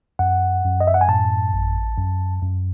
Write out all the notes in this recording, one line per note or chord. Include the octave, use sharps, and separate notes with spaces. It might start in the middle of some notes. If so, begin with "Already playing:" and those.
F#2 F#5
F#2
D#5
E5
F#5
G#5
A2 A5
A1
F#2
F#2